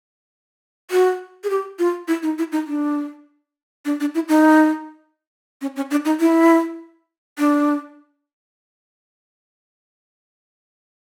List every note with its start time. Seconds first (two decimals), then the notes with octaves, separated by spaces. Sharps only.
0.91 F#4
1.44 G#4
1.50 G4
1.79 F4
2.08 E4
2.23 D#4
2.38 E4
2.52 D#4
2.67 D4
3.85 D4
4.00 D4
4.15 E4
4.29 D#4
5.62 C#4
5.76 C#4
5.91 D4
6.05 D#4
6.20 E4
7.39 D4